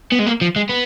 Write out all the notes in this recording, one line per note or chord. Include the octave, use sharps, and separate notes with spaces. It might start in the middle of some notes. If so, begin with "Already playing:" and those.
B3
G#3
A#3
F3
G#3
B3